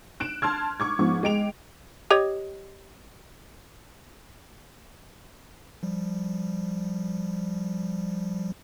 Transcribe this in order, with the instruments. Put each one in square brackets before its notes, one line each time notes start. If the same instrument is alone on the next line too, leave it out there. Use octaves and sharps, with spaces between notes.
[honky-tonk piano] F#6 D7 E7
A5 C6 F6 G#6
C#6 D6 G#6
G#2 F3 B3 C#6
G#3 G5 D7 F7
[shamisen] G4 C#5 D#5
[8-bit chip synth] F3 G3